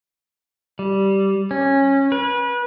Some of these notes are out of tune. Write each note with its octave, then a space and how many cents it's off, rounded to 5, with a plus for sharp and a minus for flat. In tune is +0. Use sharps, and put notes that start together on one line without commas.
G3 -10
C#4 -15
B4 -30